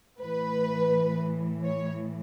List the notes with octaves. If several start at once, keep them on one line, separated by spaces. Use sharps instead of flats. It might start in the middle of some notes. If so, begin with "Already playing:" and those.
A2 E3 B4
C#5